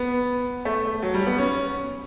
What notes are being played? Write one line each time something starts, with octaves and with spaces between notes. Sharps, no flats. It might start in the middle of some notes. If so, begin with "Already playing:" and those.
Already playing: B3
A3
F#3
G3
B3
C#4